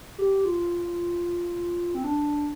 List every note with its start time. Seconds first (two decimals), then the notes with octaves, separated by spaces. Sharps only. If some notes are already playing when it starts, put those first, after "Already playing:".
0.18 G4
0.45 F4
1.95 C4
2.04 D4